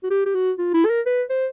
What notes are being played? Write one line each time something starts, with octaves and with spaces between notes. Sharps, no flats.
F#4
G4
G4
F#4
F4
E4
A4
A#4
B4
C5